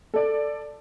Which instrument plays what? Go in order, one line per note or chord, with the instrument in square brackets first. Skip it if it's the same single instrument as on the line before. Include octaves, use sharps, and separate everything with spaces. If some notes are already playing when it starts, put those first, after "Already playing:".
[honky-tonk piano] A4 D5